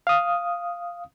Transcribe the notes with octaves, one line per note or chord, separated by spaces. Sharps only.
F5 D#6